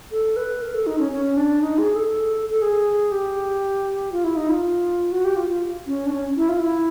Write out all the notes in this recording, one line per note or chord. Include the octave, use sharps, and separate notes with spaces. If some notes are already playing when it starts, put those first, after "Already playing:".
A4
B4
A#4
A4
D#4
C#4
C#4
D4
D#4
G#4
A4
A4
G#4
G4
F4
E4
D#4
F4
F#4
G4
F4
F4
C#4
D4
C#4
E4
F4
E4